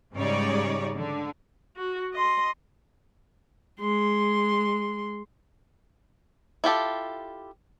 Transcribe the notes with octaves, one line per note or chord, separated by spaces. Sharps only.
G#2 C#3 G3 D#4 C#5 D5
D3
F#4
D#5 C6
G#3 C6
E4 F4 G4 A4